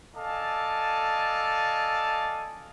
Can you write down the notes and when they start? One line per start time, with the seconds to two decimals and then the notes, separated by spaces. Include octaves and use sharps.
0.15 A4 D5 D#5 F5 G#5 A5